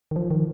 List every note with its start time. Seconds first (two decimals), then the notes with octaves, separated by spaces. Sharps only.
0.11 D#3
0.16 F3
0.31 D#3